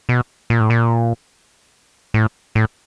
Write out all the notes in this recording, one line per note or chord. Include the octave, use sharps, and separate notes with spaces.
B2
A#2
A2
A#2
A2
A2